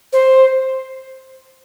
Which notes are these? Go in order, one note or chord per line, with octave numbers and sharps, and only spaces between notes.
C5